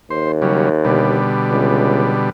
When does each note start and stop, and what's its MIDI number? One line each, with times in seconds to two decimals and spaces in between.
0.10 1.26 39
0.10 0.32 72
0.42 0.69 49
0.42 0.69 54
0.42 0.69 55
0.85 2.30 47
0.85 2.30 50
0.85 2.30 55
1.51 2.17 37